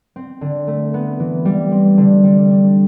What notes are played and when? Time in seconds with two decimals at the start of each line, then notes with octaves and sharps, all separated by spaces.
0.16 C4
0.41 D3
0.67 A3
0.94 B3
1.20 E3
1.45 G3
1.72 C4
1.97 D3
2.24 G3
2.50 D4